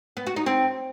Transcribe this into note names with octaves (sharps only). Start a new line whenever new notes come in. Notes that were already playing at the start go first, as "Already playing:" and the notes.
B3
F#4
D#4
C4